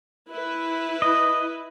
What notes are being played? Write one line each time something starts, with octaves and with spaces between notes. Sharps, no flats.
E4 B4
D#5